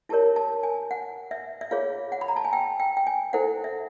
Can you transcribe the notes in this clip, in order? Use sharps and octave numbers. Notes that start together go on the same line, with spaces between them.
E4 G4 A#4 C#5 A5
A5
G#5
F#5
E5
E5
F4 G#4 C#5 F5
F#5
B5
A#5
A5
G#5
G5
G5
G5
G#5
E4 A4 C5 F#5
E5